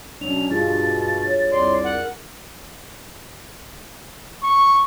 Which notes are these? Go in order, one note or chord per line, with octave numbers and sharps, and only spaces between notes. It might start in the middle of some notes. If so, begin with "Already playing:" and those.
B2 F#3 C#4 D4 F7
G2 B2 G3 F4 G#4 A6
C#5
C2 F2 D5 C6
A#4 F#5
C#6